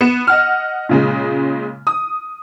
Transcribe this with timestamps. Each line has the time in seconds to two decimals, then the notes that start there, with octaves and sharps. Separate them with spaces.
0.01 B3 C#7 E7
0.27 D#5 F#5 F6
0.89 A#2 C#3 G#3
1.87 D#6